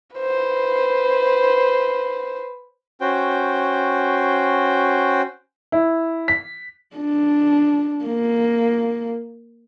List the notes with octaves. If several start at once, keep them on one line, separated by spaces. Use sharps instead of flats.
B4 C5
C#4 F#4 C5 G5
E4
B6
D4
A#3